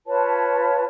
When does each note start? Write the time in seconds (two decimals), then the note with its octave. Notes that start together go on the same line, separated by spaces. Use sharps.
0.07 F4 B4 C#5 A5